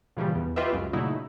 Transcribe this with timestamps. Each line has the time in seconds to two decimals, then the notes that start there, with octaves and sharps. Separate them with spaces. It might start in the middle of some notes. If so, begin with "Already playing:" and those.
0.17 A#2 C#3 E3 F3 G3
0.35 E2
0.56 E4 F4 G4 B4 D#5 E5
0.72 C#2 F#2
0.93 A#2 C#3 F#3 A3 D#4 E4